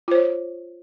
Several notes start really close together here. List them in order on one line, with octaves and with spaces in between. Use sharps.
F4 C5 C#5